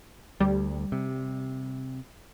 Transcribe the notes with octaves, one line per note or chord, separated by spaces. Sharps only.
D2 G3
C3